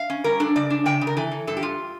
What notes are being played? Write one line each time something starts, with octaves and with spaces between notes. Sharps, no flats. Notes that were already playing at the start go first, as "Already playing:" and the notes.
Already playing: F5
C#4
G3 A#4
D4 A4
C#3 D5
D4
C#3 G5
C#3
A#4
E3 A4
E3
G2 A4
G4
G2 F4